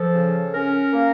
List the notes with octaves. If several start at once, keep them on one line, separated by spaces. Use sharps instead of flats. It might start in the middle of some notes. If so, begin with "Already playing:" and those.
Already playing: F3 A4
C#3
C#4 A#4
A#3